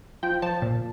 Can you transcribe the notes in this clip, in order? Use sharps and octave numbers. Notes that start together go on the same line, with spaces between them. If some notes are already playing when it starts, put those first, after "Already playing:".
F3 G5
F3 A5
A#2